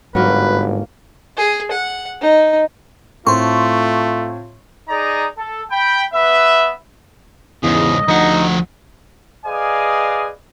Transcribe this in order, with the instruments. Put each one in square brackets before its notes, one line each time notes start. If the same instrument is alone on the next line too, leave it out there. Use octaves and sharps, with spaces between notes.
[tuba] G1 [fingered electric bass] G#2 [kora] F#3 A#3 [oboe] B4
[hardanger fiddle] G#4
F#5
D#4
[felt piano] A2 C4 [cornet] A3 [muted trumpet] F4 [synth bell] C6 C#6
[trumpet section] D#4 G#4 D5 A#5
A4
G5 B5
B3 B4 E5
[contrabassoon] E2 [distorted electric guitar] G#2 C#3 [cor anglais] D#5
[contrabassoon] D2 [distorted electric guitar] F3 F#5 [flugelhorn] D#4
[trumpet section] G#4 B4 D5 D#5 F5 G#5